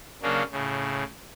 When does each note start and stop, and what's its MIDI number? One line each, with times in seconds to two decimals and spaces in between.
0.22 0.43 49
0.22 0.43 54
0.22 0.43 58
0.22 0.43 61
0.22 0.43 62
0.52 1.03 45
0.52 1.03 49